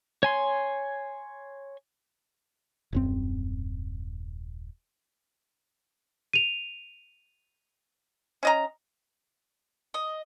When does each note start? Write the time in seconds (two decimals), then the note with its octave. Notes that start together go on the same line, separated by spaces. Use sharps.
0.23 C#5 G#5 C6
2.93 D#1 F#2 C4
6.33 D#7 F7
8.43 C#4 D#5 A#5
9.94 D#5